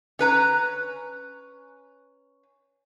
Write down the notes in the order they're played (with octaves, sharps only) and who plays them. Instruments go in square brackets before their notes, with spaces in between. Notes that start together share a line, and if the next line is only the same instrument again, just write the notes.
[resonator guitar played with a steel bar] C#4 B4 A#5